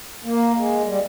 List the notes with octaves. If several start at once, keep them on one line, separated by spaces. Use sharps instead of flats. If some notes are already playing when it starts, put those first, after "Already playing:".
A#3
G#3
G3